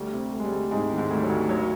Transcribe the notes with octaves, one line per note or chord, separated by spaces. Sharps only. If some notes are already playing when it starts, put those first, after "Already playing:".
Already playing: D2 G3
C3
D2
G#3
G3
D2
G#2 C3 G#3
D#3
G#2 G#3
D2 G3
F#3
D2
G#1 F#3